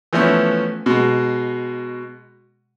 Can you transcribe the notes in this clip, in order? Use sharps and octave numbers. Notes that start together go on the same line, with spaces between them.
E3 F3 A3 B3 C#4
B2 G#3